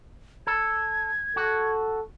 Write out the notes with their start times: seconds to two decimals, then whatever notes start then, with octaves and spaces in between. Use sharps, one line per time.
0.47 A4 G#6
1.36 F#4 A4